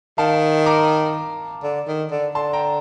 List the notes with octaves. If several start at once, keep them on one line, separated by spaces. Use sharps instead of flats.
D#3 F5 A5
A#5 D6
D3
D#3
D3
D3 A5 C6
G5 A#5